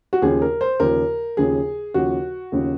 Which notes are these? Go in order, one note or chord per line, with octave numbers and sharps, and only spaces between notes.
F#4
D#2 C#3 F3 G#4
A#4
C5
D#2 C#3 F3 A#4
D#2 C#3 F3 G#4
D#2 C#3 F3 F#4
D#2 C#3 F3